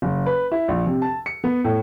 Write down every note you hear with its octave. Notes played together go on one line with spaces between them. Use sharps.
F#1
B4
E4
A#1
C3
A5
C#7
B3
A2